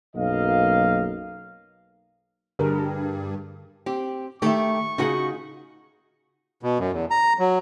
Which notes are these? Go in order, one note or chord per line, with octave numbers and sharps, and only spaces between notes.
B1 F#2 A#3 D#5 F5
G2 D3 G#4 A#4
C4 G4
D#3 A3 G4 E5 C#6
C#3 D#4 F4 F#4 G#4 F#5
B2
F#2
E2
A#5
F#3